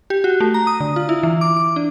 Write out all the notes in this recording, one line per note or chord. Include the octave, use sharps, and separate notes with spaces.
G4
F#4
A3
A#5
D#6
D3
F4
E4
E3
D6
D6
D4